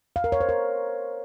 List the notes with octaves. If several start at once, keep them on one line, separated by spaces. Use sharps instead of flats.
F5
A#4
C#5
C5
A#4